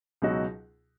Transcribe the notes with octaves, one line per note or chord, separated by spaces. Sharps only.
C#2 B2 F#3 D#4 F#4